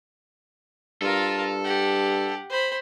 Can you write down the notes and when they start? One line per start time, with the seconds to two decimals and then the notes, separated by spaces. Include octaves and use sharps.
1.02 G2 F4 A4 A#4
1.64 G4 F#5
2.49 C5 B5